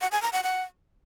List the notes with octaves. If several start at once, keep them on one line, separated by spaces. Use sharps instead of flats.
F#5
G#5
A#5
F#5
F#5